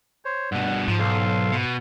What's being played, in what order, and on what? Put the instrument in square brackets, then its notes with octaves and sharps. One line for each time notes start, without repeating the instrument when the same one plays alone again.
[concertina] C5 C#5
[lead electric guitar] G2 B2 [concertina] F#5
[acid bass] G#2 [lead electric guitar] F3
[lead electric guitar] B1 [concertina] A4 F5 C6
[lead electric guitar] B2